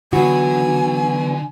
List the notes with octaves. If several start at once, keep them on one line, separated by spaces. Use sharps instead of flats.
D3 E3 F#3 B3 F#4 G#5